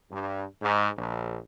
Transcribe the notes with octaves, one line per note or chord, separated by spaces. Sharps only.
G2
G#2
A#1